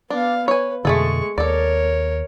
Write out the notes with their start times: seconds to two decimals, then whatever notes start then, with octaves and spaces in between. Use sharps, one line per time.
0.10 B3 D4 F5
0.48 B4 C#5 G#5
0.85 F2 B2 D3 G#3 A3 G#4 A4 C#6
1.38 D#2 A4 A#4 C#5 D5